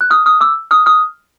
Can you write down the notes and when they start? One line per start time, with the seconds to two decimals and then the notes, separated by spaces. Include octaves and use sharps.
0.01 F#6
0.11 D#6 F6
0.26 D#6 F6
0.41 D6 E6
0.71 D#6 F6
0.86 D#6 F6